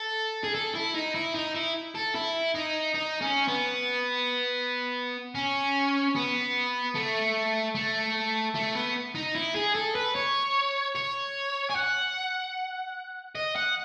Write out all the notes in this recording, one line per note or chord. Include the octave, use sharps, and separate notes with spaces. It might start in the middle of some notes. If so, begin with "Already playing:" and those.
Already playing: A4
G#4
A4
E4
D#4
E4
D#4
E4
A4
E4
D#4
D#4
C#4
B3
C#4
B3
A3
A3
A3
B3
D#4
E4
G#4
A4
B4
C#5
C#5
G#5
F#5
D#5
F#5